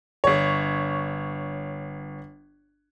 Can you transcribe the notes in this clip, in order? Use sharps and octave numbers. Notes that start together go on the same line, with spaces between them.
G1 C#5